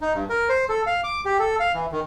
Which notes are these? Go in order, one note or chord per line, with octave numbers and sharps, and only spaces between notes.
D#4
G2
A#4
C5
A4
F5
D6
G4
A4
F5
E3
D#3